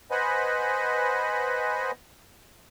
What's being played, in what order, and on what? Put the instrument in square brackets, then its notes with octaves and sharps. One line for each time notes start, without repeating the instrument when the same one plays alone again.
[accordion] B4 C5 D#5 F#5 G#5 B5